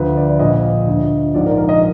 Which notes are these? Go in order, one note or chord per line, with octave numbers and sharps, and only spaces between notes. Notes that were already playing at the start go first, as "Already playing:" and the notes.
Already playing: D2 D3 F3 B4
D5
A#1 A#2 F3 D#5
D2 D3 F3
A#1 G#2 F3 D5
A#4
A#4
D#5